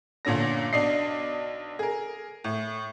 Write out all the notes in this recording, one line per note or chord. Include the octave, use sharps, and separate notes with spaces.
G1 A#2 D3 C#4 A#6
B1 D4 D5 D#5 C7
G#4 A#4
A2